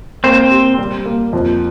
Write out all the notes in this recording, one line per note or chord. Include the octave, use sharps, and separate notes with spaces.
A#3 C4 C5
G4
G3
A#3
F2